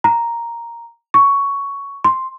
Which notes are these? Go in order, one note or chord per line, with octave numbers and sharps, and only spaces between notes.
A#5
C#6
C6